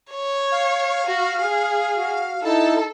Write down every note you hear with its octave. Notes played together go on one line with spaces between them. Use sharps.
C#5
F5
F#4
G#4
F#4
D#4 E4 A4 A5